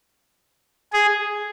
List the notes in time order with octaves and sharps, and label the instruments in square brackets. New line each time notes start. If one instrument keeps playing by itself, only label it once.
[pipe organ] G#4